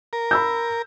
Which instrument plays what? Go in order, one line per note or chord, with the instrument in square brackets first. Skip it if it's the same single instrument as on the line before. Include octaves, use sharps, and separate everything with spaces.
[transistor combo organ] A#4
[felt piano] B5 E6 G6